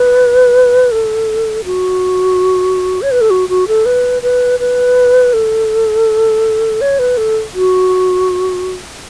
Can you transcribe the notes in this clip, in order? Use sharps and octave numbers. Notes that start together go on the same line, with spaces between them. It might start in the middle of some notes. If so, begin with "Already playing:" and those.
Already playing: B4
A4
F#4
C#5
B4
A4
F#4
F#4
A4
B4
B4
B4
A4
C#5
B4
A4
F#4